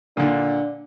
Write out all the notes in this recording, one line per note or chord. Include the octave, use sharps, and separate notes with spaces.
A#2 D3 D4